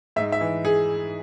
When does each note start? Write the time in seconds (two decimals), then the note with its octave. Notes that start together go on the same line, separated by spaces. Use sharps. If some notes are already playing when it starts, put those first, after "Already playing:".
0.16 G#2 E5
0.32 E5
0.41 E3
0.65 G#4